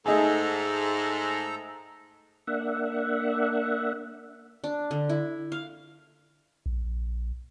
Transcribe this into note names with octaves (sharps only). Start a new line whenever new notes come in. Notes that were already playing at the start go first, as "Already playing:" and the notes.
G#2 A3 D#4 G#4 A4 A#5
A#3 D4 E5 F#5
D4
D3
E4
F5
A#1